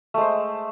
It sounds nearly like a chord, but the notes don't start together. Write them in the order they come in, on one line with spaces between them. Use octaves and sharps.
A3 G#3 C5